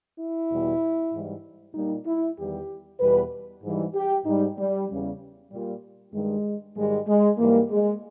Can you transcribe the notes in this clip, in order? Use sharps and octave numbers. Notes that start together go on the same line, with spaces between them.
E4
E2 B2 G3
G#2 E3 G3
A#2 G3 D#4
E4
E2 D#3 G3 G4
E2 B2 G3 B4
G#2 E3 G3
G4
G#2 G3 D#4
G3
E2 C#3 G3
A#2 G3
G2 D#3 G3 G#3
G#2 D#3 G3 G#3
G#3
G#2 E3 G3 A#3
G#3